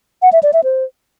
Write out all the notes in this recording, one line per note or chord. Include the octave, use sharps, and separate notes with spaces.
F#5
E5
D5
E5
C5